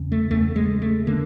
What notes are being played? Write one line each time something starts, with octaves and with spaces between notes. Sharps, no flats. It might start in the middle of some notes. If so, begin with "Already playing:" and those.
Already playing: E2 C#3
A3
E2 C#3 A3
G#3
A3
D3 A#3